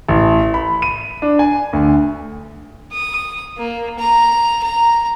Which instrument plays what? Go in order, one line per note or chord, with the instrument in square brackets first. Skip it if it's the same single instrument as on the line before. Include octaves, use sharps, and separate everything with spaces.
[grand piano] A1
B5
D#7
D4
G#5
D2
[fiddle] D#6
A#3
A#5
A#5